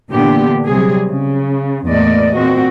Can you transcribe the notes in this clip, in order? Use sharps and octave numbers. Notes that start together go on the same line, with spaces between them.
A#2 D3 E3 B3 D4 G4
C3 F#3 G3 G#4
C#3
E2 A2 A#3 D5 D#5
A#2 C4 F#4